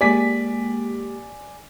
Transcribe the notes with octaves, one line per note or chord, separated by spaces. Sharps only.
G#3 A#3 G4 D5 G#5 B6